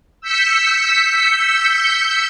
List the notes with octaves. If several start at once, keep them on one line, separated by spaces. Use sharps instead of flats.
E6 G6 B6 C#7